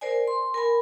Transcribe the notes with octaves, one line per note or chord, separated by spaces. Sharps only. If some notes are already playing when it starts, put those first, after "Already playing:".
A#4 C5 D5 G#5
C6
A#4 G#5 B5